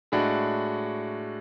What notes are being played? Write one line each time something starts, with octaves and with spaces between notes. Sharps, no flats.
A2 G#3 D4 F#4